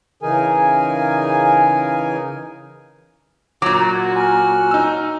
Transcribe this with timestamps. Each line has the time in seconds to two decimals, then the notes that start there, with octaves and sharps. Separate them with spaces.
0.23 C#3 E3 D#4 G#4 A#4 G#5
3.62 A#2 F#3 F#4 D6
4.16 G#5 F6
4.71 D#4 E6